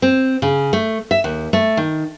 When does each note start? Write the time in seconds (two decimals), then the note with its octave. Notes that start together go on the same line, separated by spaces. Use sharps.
0.02 C4
0.42 C#3
0.73 A3
1.11 E5
1.24 D#2
1.53 A3
1.77 D#3